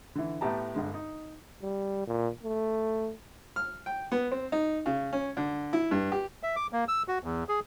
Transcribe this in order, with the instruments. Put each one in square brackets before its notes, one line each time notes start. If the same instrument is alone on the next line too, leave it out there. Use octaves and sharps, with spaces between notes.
[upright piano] D3 E3
A2 A3 B3 G4 A5 A#5
G1 D3 G#3
D#4
[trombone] G3
A#2
A3
[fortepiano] F6
G5
B3
C4
D#4
C#3
C#4
D3
E4
G2
G4
[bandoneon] E5
D6
A#3
E6
F#4
E2
G#4